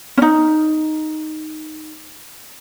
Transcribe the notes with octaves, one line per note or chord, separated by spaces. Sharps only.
C#4 D#4